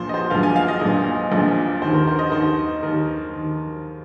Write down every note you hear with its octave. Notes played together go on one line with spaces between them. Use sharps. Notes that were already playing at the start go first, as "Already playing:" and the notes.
Already playing: A#1 A#2 F3 C5
D#5
C5
A#1 A#2 F3 F5
G#5
F5
D#5
A#1 A#2 F3
A#1 A#2 F3
D#2 D#3 C5
A#4
C5
D#5
D#2 D#3 C5
D#2 D#3 A#4
D#3